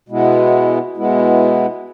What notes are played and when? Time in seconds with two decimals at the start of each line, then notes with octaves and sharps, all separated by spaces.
0.09 B2 G#3 B3 E4
0.97 B2 G#3 B3 E4